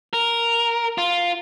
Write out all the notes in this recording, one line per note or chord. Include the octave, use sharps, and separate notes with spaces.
A#4
F4